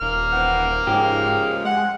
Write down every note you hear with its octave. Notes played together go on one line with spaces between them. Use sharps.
D#1 A#3 F6
E3 C4 F#5
G#2 C#3 F3 G#3 G4
G#3 F#5